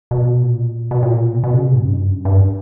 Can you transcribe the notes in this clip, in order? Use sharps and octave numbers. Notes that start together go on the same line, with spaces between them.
B2
A#2
B2
A#2
B2
B2
C#3
C3
G#2
F#2
G2
F#2
G2